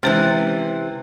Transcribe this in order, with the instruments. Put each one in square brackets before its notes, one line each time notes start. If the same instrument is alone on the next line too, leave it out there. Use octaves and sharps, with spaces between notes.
[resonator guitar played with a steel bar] C3 E3 [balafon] G#3 C#4 C5